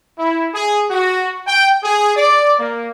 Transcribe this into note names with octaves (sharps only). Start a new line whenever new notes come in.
E4
G#4
F#4
G5
G#4
D5
A#3